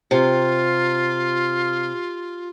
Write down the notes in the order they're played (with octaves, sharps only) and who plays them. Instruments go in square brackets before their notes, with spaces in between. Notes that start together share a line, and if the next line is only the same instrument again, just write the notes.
[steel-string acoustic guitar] C3 [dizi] F4